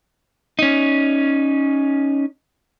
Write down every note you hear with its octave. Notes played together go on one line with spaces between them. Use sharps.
C#4 D#4